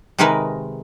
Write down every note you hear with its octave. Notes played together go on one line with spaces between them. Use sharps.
C3 D#3 G#3 D#4 A#4 B4